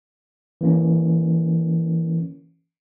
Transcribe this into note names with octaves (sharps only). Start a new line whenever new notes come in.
E3 A#3 C#4